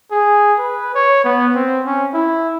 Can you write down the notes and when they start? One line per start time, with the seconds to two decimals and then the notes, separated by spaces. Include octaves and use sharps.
0.11 G#4
0.59 B4
0.95 C#5
1.24 B3
1.55 C4
1.85 C#4
2.14 E4